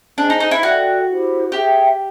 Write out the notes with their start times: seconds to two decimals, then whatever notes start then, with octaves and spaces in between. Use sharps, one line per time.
0.17 D4 G#4 C5 D#5 G#5
0.30 D#4
0.40 D#4
0.51 E4
0.63 F#4 A4 D5 G5
1.08 E4 G4 C5
1.52 G4 G#4 C5 E5 G5